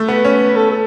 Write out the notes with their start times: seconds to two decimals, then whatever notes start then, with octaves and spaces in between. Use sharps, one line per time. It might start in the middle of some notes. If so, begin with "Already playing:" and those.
Already playing: A3
0.08 B3 B4
0.25 C#4
0.56 A4
0.71 A4